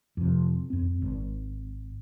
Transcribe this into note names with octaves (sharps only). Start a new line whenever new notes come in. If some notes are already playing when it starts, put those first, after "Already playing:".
F2 C3
F2 C4
G#1